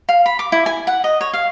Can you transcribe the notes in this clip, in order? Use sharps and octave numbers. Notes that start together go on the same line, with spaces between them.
F5
B5
D6
E4
G#5
F#5
D#5
C#5
F5